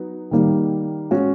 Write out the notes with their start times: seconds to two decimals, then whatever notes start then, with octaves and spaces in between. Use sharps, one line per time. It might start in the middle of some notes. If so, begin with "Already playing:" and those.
Already playing: F#3 B3 D#4
0.31 D#3 G3 A#3 D#4
1.11 G#3 C#4 F#4